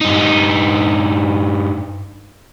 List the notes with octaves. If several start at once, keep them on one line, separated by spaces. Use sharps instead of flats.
G2 D#4